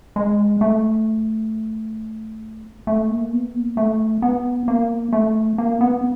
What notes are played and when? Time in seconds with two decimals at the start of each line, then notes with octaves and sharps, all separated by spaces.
0.16 G#3
0.61 A3
2.87 A3
3.10 A#3
3.33 B3
3.55 A#3
3.77 A3
4.22 B3
4.68 A#3
5.13 A3
5.58 A#3
5.81 B3